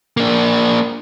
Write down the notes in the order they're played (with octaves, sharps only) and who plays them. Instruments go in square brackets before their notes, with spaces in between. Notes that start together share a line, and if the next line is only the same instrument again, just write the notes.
[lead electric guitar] A#3 D4